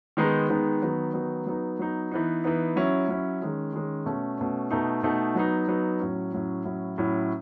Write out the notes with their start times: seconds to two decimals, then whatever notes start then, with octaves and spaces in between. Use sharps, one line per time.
0.17 D#3 G#3 B3 D#4
0.49 D#3 G#3 B3 D#4
0.82 D#3 F#3 B3 D#4
1.14 D#3 F#3 B3 D#4
1.46 F#3 B3 D#4
1.79 F#3 B3 D#4
2.11 E3 B3 D#4
2.44 E3 B3 D#4
2.76 F#3 C#4 E4
3.08 F#3 C#4 E4
3.41 D#3 G#3 C#4
3.73 D#3 G#3 C#4
4.05 B2 A3 C#4
4.38 B2 A3 C#4
4.71 B2 A3 D#4
5.03 B2 A3 D#4
5.35 F#3 B3 D#4
5.68 F#3 B3 D#4
6.00 A2 F#3 C#4
6.33 A2 F#3 C#4
6.65 A2 F#3 C#4 E4
6.98 A2 F#3 C#4 E4